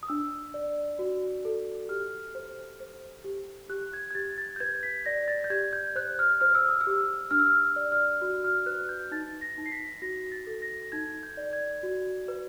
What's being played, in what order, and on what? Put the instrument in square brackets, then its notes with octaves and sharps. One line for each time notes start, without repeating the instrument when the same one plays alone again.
[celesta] D#6
D4 E6
D5
F#4
A4
G4 F6
C5
C5
G4
G4 F#6
G#6
G#6
G4 A6
A6
G6
B4 G#6
B6
D5 A#6
A6
G6
G4 G#6
G6
C5 F#6
F6
C5 F6
E6
D#6
E6
G4
D4 F6
E6
F6
D5
F6
F#4
F6
B4 F#6
G6
D#4 A6
A#6
D#4
C7
B6
F#4 A#6
A6
A4
A#6
D#4 G#6
G6
D5
G#6
F#4
B4